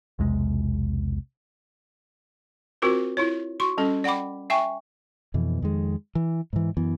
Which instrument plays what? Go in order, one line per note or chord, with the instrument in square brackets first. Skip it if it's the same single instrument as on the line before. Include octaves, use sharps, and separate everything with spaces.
[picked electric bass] B1 E2 C3 G#3
[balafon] C4 F4 F#4 A#4 C5
E4 F4 C#5
F#4 C6 C#6
G3 C#4 A4
D5 F#5 G5 B5 D6
E5 G5 G#5 C#6
[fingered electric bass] F2 B2 E3
F2 D#3 G#3
E3
G#2 E3
F#2 E3 B3